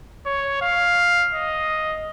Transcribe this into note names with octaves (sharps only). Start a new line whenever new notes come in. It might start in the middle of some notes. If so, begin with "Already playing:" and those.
C#5
F5
D#5